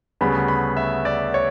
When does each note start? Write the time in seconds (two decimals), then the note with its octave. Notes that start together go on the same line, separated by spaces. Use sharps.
0.21 D2 C#3 G3 B3 B5
0.48 B5
0.77 E5
1.05 D5
1.34 C#5